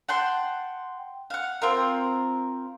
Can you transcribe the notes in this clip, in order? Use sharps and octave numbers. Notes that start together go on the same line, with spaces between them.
F#5 G5 A5 C6
F5 F#5
C4 F4 A#4